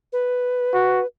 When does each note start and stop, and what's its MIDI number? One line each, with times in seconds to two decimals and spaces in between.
0.13 1.06 71
0.73 1.00 66